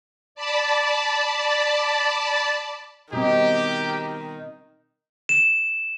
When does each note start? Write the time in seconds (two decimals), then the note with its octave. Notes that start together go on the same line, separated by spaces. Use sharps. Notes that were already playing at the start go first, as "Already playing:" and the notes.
0.35 D5 A5 B5
3.13 B2 D#3 G3 C4 D#4 G4
5.29 E7